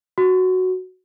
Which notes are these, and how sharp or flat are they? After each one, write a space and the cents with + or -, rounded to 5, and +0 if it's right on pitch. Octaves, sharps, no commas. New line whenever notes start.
F#4 +0